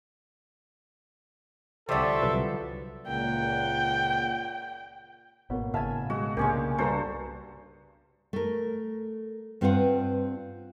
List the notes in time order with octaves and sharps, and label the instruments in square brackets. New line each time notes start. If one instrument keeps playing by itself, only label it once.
[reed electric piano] C2 D5 C#6 [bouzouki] D3 F3 [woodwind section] G4 E5 [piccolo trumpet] A4
[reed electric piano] C2 F#3 B4
[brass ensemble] C#2 A#2 F#5 [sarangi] G5
[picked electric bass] G#1 [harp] B2 [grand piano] A#3 C#5
[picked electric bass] A2 C#3 [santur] E5 G#5 [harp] F5 A5 B5
[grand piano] G#3 [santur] F#4
[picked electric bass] C2 C#3 [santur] G#3 C#4 G4 [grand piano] A#3 D4
[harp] G2 B4 A#5 [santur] F#4 A4 C5
[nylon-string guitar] A3 A#4
G2 C4 F4 B4 F5 F#5